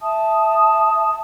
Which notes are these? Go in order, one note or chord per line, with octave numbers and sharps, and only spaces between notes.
E5 A5 D#6